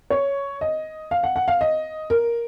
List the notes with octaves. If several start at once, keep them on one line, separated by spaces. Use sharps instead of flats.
C#5
D#5
F5
F#5
F#5
F5
D#5
A#4